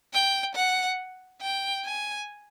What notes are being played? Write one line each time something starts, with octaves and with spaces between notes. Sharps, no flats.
G5
F#5
G5
G#5